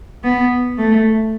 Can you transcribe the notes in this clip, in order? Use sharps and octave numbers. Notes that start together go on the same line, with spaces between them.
B3
A3